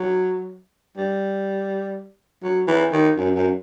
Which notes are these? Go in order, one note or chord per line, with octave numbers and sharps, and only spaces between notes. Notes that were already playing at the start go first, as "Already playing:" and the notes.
Already playing: F#3
G3
F#3
E3
D#3
F#2
F#2